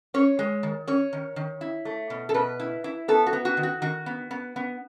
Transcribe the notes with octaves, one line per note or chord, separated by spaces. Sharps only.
C#4 C#5
G#3
D#3
C#4 C#5
D#3
D#3
E4
A3
B2
A4
B2 B4
E4
E4
B3 A4
F#4
B3
F#4
D#3
F#4
D#3 F#4
B3
B3
B3